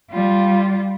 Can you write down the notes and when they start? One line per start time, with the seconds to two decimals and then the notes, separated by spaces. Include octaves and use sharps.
0.11 G3 F4